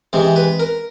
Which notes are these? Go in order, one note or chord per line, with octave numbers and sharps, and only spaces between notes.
C3 E3 G#3 C5
B4
A#4